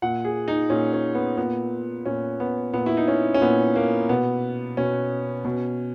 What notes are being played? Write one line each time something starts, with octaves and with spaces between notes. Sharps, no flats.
A#2 F#5
G#4
D#4
A#2 C#4
C#4
B3
A#2 B3
A#2 C#4
B3
A#2 B3
E4
D#4
C#4
C#4
A#2 B3
A#3
B2 B3
B2 C#4
B2